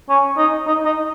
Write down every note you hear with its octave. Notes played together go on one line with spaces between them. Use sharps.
C#4
D#4
D#4
D#4